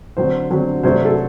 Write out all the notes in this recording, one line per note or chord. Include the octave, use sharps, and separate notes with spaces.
D3 F#3 C4 C5
D3 F#3 C4
C3 F#3 A3 D4 C5
A4